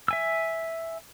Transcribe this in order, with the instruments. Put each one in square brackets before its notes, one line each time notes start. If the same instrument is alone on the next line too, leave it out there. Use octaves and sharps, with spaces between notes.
[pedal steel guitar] E5 G#5 E6